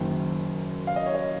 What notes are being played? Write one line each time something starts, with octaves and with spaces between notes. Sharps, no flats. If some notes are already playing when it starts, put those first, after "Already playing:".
Already playing: F#1 F#2 D#3
F5
D#5
C#5
D#5